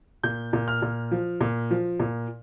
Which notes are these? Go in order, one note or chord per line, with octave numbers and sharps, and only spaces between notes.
A#2 G6
A#2
F6
A#2
F3
A#2
F3
A#2